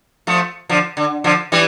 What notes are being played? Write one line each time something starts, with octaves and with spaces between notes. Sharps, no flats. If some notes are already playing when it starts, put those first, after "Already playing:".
F3 A3
D3 F3
D3
D3 F3
E3 G3